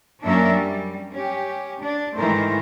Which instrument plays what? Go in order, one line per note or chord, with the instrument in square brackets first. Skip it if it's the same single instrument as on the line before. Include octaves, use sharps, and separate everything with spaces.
[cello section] F#2 A#3 C#4 D4 A#4 E5
G3
C#4 G4
D4
G#2 D#3 E3 A3 A#4 C5